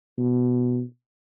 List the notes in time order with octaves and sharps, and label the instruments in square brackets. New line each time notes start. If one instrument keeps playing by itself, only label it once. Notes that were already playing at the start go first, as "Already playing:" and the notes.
[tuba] B2